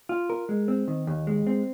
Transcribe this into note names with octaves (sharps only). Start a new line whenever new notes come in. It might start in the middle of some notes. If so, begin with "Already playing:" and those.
F4
A#4
G#3
C4
D#3
D#2
G#3
C4